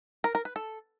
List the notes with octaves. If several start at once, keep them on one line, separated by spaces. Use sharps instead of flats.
A#4
A#4
B4
A4